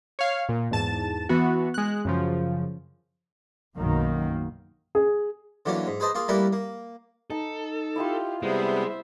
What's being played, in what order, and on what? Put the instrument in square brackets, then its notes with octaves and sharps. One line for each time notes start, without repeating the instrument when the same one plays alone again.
[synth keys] C#5 F5
A#2
E2 G#2 A5 A6 E7
E3 B3 F#4
G#3 F#6
F#2 C#3 F3
[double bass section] B1 F#2 D#3 A#3
[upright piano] G#4
[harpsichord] D3 E3 F#3 A#3 C#4
G#2
G#4 B4 C5 D#5 A5
A#3 F4 G#4
G3 A3 A#3 E4 A#4 B4
A#3
[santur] D#4 A5 [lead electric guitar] A4
[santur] E4 D#5 C6 [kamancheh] F4 G4
[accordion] C3 G3 B3 [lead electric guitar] G#3 [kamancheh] C5 E5